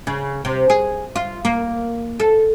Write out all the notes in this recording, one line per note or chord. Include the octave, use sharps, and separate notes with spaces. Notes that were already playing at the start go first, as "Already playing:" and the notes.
C#3
C3
G#4
F4
A#3
A4